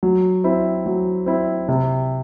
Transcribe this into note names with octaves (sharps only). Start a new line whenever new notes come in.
F#3
C4 E4
F#3
C4 E4
C3